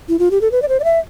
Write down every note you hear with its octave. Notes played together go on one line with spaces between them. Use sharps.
E4
F4
G4
A4
B4
D5
C5
D5
E5